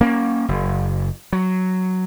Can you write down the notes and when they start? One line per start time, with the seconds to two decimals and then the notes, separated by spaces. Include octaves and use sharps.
0.01 A#3 C#4
0.48 F#1
1.33 F#3